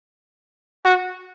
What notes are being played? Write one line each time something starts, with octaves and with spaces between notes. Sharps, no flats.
F#4